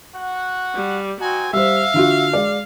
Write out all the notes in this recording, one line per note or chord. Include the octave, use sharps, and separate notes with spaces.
F#4 F#5
G3
C4 D#4 F#4 G#5
G3 C5 E5 F5
D3 F4 F#4
G#3 D5